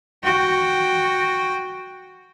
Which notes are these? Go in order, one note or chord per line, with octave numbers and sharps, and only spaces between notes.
F#4 G5